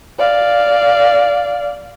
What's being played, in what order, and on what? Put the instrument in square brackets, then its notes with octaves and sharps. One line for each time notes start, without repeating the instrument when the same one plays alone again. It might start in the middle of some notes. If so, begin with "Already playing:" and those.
[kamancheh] D5 F5